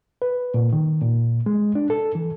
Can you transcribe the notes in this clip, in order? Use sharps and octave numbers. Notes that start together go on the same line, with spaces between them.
B4
A#2
D#3
A#2
G#3
D4
A4
E3